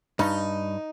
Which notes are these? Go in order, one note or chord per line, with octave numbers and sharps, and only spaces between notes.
G2 D#4